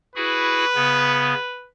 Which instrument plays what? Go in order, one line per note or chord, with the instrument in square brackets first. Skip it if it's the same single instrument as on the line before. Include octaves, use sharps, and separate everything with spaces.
[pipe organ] E4 F#4 G#4 [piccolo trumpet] B4
[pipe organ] C#3 B3